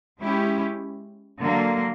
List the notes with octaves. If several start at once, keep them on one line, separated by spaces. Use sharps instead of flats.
G#3 C#4 E4 G4
D3 F#3 A#3